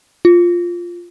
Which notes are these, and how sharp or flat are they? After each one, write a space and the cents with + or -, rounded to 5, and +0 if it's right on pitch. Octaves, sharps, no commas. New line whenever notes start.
F4 +0